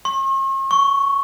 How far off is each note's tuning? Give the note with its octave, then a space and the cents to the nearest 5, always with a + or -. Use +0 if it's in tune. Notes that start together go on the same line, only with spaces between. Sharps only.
C#6 -45
C#6 +5